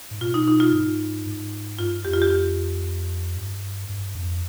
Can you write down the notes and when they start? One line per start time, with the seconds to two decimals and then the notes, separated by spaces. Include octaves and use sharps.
0.11 G#2
0.21 B2 F4
0.34 D#4
0.48 D#4
0.60 F4
0.73 G#2
1.26 G#2
1.79 G2 F4
2.05 F2 G4
2.14 F4
2.22 G4
2.30 F4
3.36 G2
3.89 G2
4.15 F2